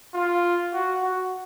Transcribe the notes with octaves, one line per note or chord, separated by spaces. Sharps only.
F4
F#4
F#4